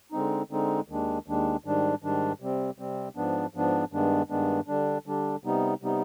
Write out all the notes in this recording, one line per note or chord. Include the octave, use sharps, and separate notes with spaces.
D3 G#3 C4 D#4
D3 G#3 C4 D#4
D#2 D#3 G#3 D4
D#2 D#3 G#3 D4
G#2 D#3 G3 D4
G#2 D#3 G3 D4
C3 G3 C4
C3 G3 C4
G#2 F3 B3 D4
G#2 F3 B3 D4
G2 D#3 G#3 B3 D4
G2 D#3 G#3 B3 D4
D3 G3 D4
D3 G3 D4
C3 G3 B3 D#4
C3 G3 B3 D#4